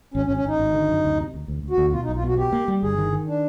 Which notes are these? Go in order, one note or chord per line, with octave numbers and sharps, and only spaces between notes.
G#1 C#4
C#4
G#1
C#4
G#1 D#4
G#1
D3
F#2
D2
C3
D2
D2
D2
F#4
D2
B2 F4
D#4
B1
F4
B2 F#4
B2 G4
A#3
G3
G1 G#4
D#3
D#3
D4